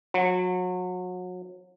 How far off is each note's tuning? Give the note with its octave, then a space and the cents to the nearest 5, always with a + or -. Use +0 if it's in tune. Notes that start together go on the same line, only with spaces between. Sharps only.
F#3 -30